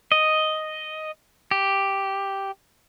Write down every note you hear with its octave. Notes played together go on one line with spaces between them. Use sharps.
D#5
G4